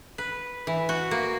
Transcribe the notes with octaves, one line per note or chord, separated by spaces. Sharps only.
B4
E3
F#4
A#3